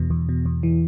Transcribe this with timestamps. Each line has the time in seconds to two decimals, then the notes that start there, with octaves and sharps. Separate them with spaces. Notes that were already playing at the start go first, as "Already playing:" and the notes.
Already playing: E2 B2
0.10 E2
0.29 B2
0.46 E2
0.63 E3